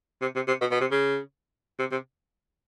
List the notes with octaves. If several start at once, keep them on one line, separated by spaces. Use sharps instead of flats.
C3
C3
C3
B2
B2
C3
C#3
C3
C3